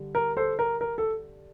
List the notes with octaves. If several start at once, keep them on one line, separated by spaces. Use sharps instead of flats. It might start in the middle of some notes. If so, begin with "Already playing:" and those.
Already playing: D3 G3
A#4
A4 C5
A#4
A#4
A4